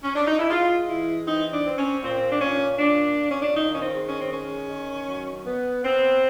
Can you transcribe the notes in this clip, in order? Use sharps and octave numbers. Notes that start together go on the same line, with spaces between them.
C#4
D4
D#4
E4
G#3 F4
E3 E4
C4 D#4
D4
C4
C#4
A#2 C4
D4
A#2 C#4
A#2 D4
A#2
C#4
D4
D#3 D#4
C#4
C4
G#3
C#4
C4
D#3 C#4
D#3
F#3
B3
B3 C4